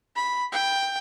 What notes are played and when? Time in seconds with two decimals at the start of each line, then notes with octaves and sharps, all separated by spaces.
0.16 B5
0.52 G5